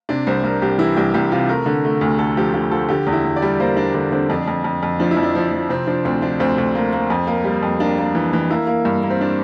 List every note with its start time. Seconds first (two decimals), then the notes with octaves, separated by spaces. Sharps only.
0.09 C3 D4
0.27 C2 C5
0.43 C2 A#4
0.62 C2 G4
0.78 E3 E4
0.97 C2 G4
1.14 C2 G4
1.32 C3 F4
1.49 A3 A#4
1.66 D3
1.85 A3
2.01 D2
2.19 D2 A4
2.37 F3 G4
2.54 D3 G4
2.71 F3 A4
2.89 D3 G4
3.07 E2
3.13 E4
3.24 E2
3.36 D5
3.42 G3
3.60 A#3 C5
3.76 A#3 D4
3.94 D3 D4
4.12 D3 C4
4.30 F2 D4
4.48 F2
4.64 F2
4.83 F2
5.00 F3 D4
5.11 E4
5.17 F2
5.23 D4
5.35 F3
5.52 F3
5.69 C3 C4
5.87 F3 D4
6.05 D2 C4
6.22 F3 D4
6.40 D2 C4
6.58 D2
6.75 A#3
6.93 A#3
7.10 F2
7.27 A#3
7.44 G3
7.63 F2
7.80 A#3 D4
7.98 A#3
8.15 E3
8.33 E3
8.50 A#3 E4
8.67 A#3
8.85 G2
9.03 A#3
9.10 C4
9.21 D4